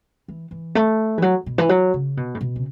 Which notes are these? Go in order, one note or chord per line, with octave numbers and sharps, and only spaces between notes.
E3
E3
A3
E3
F#3
B2
E3
F#3
C#3
B2
A2
B2
C#3